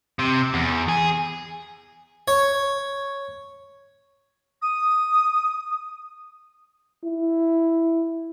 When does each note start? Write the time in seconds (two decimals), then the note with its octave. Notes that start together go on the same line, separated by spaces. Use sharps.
0.19 C3
0.54 E2
0.89 G#4
2.28 C#5
4.62 D#6
7.04 E4